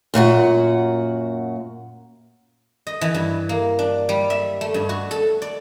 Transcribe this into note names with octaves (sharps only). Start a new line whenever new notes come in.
F#2 A#2 F#4 F#5
D#5
E3
G2
A#3
D4
G3
E5
A3
G2
F#4
A4
D5